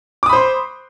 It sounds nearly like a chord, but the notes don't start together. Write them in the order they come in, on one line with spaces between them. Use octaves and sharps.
D6 D#6 B5 C5 C6